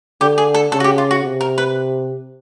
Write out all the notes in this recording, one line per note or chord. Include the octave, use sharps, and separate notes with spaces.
D3 G4
G#4
A4
C#3 A4
F#4
G4
F4
F#4
C3
A#4
B4